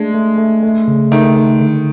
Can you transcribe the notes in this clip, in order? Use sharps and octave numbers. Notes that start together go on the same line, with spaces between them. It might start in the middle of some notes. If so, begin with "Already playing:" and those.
Already playing: G#3 A3 D4
A3
A3
A3
C#3
D#3 A3
A3
D3